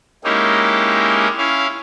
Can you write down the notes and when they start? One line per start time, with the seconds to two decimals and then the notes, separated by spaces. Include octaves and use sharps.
0.24 G#3 A#3 C#4 D#4 E4 G4
1.38 C#4 E4 F5